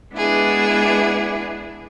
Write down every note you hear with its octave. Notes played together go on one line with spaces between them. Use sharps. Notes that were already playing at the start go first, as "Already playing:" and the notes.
G#3 B3 D4 E4 G#4